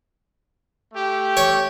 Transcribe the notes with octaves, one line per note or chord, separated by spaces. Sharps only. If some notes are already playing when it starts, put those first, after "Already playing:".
A3 G4
C#5